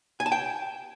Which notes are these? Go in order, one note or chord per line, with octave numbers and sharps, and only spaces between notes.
G#5
A5
G5